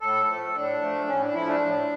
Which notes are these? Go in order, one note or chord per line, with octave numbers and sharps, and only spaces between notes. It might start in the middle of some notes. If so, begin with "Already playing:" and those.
A2 A4
F3 A3
A2 D4
F3 A3
A2 C#4
D4
F3 A3 E4
D4
A2